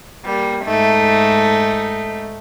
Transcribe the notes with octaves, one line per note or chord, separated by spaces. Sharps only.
G3 A#3
G#2 A3 D#4